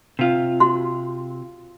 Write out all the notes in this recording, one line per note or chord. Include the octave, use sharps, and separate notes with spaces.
C3 F4
F#4 C6